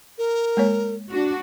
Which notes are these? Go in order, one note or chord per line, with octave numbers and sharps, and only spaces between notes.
A#4
G#3 A#3 C#5
D4 F#4